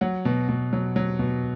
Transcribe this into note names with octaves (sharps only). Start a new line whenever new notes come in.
F#3 F#5
B2
B2
F#3
F#3
B2